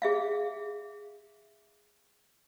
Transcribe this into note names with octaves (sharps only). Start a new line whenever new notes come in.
G#4 E5 F5